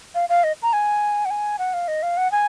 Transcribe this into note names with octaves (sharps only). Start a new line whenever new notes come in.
F5
F5
D#5
A#5
G#5
F#5
G#5
F#5
F5
D#5
F5
F#5
G#5